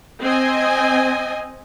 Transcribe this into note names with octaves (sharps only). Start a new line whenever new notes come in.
C4 D#5 G#5